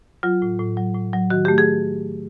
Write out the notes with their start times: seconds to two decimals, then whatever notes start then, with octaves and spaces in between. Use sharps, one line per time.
0.23 F#3 F4
0.42 A2
0.59 A2
0.77 F#3
0.95 A2
1.13 F#3
1.30 D#3 F#4
1.45 G4
1.48 A3
1.58 G#4